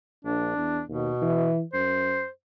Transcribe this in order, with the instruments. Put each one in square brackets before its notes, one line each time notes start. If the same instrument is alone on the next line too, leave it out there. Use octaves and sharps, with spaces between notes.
[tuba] A#1 [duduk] D4
[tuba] E2
[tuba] D#2 [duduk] B2
[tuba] E3
[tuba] F#2 [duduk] C5